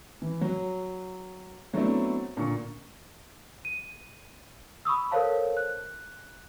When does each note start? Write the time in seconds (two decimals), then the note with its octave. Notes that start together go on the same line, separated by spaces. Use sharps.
0.22 E3
0.41 F#3
1.73 F#3 A3 B3 C4 D4 E4
2.37 A#2 D3 C#6
3.65 D#7
4.85 B5 C#6 D#6 E6
5.11 A4 A#4 C5 C#5 F5 A5
5.57 F#6